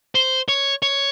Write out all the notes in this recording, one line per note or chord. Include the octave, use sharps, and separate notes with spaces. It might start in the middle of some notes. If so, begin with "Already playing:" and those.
C5
C#5
C#5